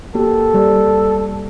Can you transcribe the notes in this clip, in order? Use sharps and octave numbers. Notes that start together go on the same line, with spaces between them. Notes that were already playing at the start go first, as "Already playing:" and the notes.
A#3 F#4 G4 A4
G3 C5